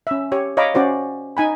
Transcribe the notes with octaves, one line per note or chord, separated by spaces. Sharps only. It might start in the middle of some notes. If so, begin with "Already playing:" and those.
C#4 E5
G4 C#5
C#5 D#5 F5 A#5 B5 D6
C#4 F#4 C5 D5
D#4 G#5 B5